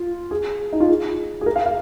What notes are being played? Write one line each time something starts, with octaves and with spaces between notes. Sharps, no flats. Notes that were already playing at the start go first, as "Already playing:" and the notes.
Already playing: F4
G#4
D#4
F4
G#4
G#4
A#4
F5
F5